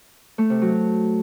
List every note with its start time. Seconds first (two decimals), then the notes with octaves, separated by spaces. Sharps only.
0.38 A3
0.50 C3
0.62 F#3